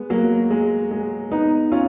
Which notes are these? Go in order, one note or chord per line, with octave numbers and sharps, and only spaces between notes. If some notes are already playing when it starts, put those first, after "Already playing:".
Already playing: G#3 B3
F#3 A#3
G#3
G#3
B3 D#4
C#4 F4